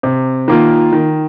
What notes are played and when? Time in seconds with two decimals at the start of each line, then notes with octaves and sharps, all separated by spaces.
0.03 C3
0.48 D#3 A#3 F4
0.93 D#3